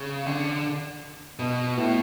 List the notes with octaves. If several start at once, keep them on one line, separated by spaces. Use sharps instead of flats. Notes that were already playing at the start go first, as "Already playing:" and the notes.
Already playing: C#3
D3
B2
A2